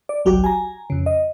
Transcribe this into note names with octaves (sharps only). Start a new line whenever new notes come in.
D5
G#1 C#2 F#3 F#4 G4 D6
G#5 A#5
F2 C#3
D#5